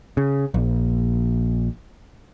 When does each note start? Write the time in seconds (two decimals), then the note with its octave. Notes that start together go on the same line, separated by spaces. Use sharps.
0.17 C#3
0.54 A#1